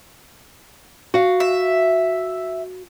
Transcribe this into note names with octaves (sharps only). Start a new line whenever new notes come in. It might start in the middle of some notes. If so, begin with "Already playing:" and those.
F#4 F5
E5